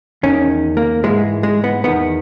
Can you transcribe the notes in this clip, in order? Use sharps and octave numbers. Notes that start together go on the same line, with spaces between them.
E2 D#3 C#4
A#3
G#2 E3 G#3
G#3
B3
E2 D#3 B3